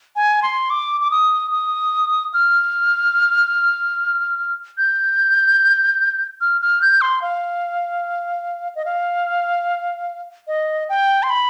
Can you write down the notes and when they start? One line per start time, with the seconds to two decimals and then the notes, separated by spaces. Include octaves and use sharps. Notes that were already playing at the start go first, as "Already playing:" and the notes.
0.16 G#5
0.42 C6
0.70 D6
1.01 D6
1.11 D#6
1.51 D#6
2.34 F6
4.78 G6
6.41 F6
6.61 F6
6.82 G6
7.01 C6
7.22 F5
8.75 D#5
8.85 F5
10.47 D#5
10.89 G5
11.23 C6
11.30 B5